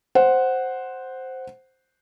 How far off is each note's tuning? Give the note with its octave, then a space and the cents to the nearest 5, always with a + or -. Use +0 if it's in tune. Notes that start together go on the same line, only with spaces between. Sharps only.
C5 +0 F#5 +0